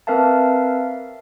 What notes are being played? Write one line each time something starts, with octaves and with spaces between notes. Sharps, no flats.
C4 A#4 B4 E5 F5 A5